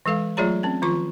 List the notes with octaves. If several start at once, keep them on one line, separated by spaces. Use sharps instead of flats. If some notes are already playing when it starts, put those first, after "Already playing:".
E3 G#3 A4 F5
F#3 A3 F4 G#4 C#5 A#5
C4 C#4
D#3 F3 F4 C#6